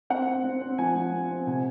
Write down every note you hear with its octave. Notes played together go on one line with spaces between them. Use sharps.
C4 F#5
C4
C4
C4
F3 G#5
F3
C4
C4
C3 G#5